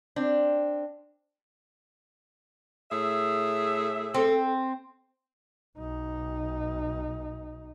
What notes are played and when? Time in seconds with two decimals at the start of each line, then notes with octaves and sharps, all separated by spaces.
0.16 C4 D4
2.91 A2 G#4 E5
4.14 C4 A4
5.78 B1 D#4